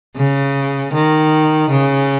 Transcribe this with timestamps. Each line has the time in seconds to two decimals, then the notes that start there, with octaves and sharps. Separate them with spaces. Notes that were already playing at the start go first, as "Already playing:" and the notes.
0.16 C#3
0.93 D#3
1.70 C#3